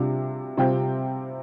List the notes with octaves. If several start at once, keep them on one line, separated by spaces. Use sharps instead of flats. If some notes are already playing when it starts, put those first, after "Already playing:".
Already playing: C3 G3 D4 F4
C3 G3 C4 F4 G5